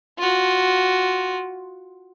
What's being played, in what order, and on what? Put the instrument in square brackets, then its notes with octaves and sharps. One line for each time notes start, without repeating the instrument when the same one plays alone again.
[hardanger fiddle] F4 F#4